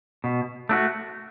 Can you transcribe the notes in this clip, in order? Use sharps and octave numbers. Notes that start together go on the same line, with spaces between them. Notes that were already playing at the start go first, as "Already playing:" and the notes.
B2
A3 D4 F#4